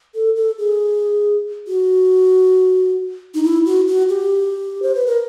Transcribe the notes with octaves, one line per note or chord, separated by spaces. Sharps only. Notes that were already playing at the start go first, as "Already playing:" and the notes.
A4
A4
G#4
F#4
D#4
E4
F#4
F#4
G4
C5
B4
A#4